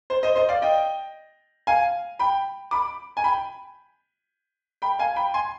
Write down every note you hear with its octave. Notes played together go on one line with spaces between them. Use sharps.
C5
C5 D#5
C5 D#5
D5 F5
D#5 G5
F5 G#5
G5 B5
B5 D6
G#5
G5 B5
G5 B5
F5 G#5
G5 B5
G#5 C6